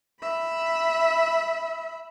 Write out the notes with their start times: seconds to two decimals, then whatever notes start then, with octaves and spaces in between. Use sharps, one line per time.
0.23 E5 B5